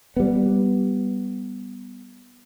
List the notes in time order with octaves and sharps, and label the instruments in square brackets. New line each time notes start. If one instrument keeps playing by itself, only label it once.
[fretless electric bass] G3 B3